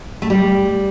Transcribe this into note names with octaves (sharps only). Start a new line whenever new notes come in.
A3
G3